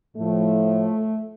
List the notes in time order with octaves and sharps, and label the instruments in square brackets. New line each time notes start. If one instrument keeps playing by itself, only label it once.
[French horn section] A2 F3 A3